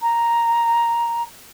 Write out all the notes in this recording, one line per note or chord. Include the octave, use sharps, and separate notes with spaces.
A#5